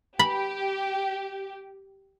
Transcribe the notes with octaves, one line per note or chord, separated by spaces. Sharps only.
G4 B5